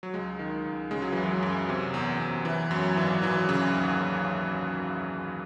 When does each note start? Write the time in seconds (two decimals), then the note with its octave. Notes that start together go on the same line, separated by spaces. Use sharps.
0.03 F#3
0.14 C#2 G#3
0.39 D#3
0.65 C#2
0.91 C#3 G#3
1.02 F#3
1.12 F#2 E3
1.23 F#3
1.43 F#2
1.69 C3
1.94 E2
2.20 E2
2.45 E3
2.71 F#2 F#3
2.97 G#1 E3
3.22 E3 F#3
3.49 C#3
3.75 D#2